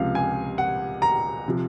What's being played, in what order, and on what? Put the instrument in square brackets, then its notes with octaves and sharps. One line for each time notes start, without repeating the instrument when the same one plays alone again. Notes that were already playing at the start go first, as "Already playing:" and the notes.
Already playing: [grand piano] C#2 C3 F3 F5
G#5
F#5
A#5
C3 F3